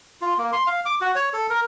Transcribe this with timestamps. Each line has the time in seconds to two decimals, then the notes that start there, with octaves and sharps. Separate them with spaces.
0.22 F4
0.38 A#3
0.53 C6
0.67 F5
0.86 D6
1.01 F#4
1.15 C#5
1.33 A4
1.50 A#4